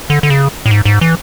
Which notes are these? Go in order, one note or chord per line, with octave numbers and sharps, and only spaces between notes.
D3
D3
C#3
A2
G#2
G#2
E3